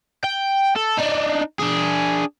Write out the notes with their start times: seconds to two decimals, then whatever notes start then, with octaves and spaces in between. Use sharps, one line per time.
0.24 G5
0.76 A4
0.97 D4 D#4
1.59 D4 G#4